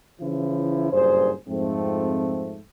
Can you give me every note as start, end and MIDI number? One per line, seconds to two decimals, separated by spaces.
0.21 0.92 49
0.21 0.92 52
0.21 0.92 53
0.21 0.92 64
0.92 1.32 30
0.92 1.32 43
0.92 1.32 46
0.92 1.32 68
0.92 1.32 72
1.48 2.58 41
1.48 2.58 44
1.48 2.58 53
1.48 2.58 57
1.48 2.58 60